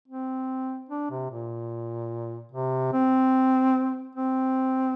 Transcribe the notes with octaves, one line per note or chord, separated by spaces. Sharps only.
C4
D4
C3
A#2
C3
C4
C4